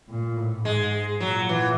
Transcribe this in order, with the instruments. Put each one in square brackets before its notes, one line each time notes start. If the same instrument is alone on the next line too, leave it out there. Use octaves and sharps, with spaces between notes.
[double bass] A#2
A2
[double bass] G#2 [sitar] G#3
[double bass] A#2 [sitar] F#3
[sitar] E3